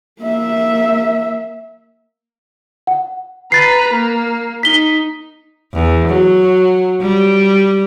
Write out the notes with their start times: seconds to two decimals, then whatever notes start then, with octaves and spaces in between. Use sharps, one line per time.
0.21 A#3 E5
2.87 F#5
3.52 B4 A#5 A6 C7
3.93 A#3
4.63 D#4 B6 G7
5.73 E2
6.08 F#3
7.01 G3